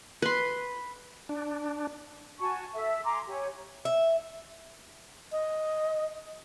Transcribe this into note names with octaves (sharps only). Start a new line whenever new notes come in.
B4 C6
D4
F#4 G#5 A5 C#6
A4 E5
G#5 A#5 C6 D6
G4 C#5 G#5
E5
D#5